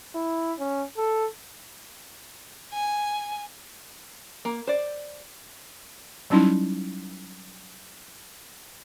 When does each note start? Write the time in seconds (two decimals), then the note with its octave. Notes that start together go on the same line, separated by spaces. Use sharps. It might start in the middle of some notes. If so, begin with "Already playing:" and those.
0.15 E4
0.59 C#4
0.97 A4
2.73 G#5
4.45 A#3
4.67 C5 D5
6.30 F#3 G3 C#4 D#4 E4